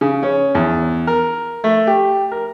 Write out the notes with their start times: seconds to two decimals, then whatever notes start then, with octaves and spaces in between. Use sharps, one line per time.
0.01 C#3
0.23 C#4
0.55 E2
1.07 A#4
1.64 A3
1.87 G4
2.32 A#4